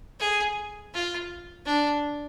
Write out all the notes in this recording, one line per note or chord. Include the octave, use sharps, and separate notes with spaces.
G#4
F4
D4